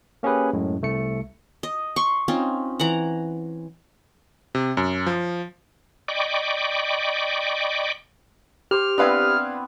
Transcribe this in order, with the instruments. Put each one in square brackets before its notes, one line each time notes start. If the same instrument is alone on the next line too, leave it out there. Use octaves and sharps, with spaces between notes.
[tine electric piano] A#3 C#4 G4 G#4 B4
F#2 A2 G#3
C2 A3 C#7
[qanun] D#5
C6 C#6
C4 C#4 D#4 F4
E3 F#5 A#5
[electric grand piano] C3
F#2
F3
[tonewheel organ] D5 D#5 G5 B5 C#6 D6
[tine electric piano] G4 [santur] C5 D6 [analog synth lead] F6
[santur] B3 C4 E4 [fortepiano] D4 B4 F5